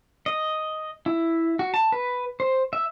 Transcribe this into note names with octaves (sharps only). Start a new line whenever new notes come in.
D#5
E4
F#4
A5
B4
C5
E5